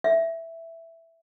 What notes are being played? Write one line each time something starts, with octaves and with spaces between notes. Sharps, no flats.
E5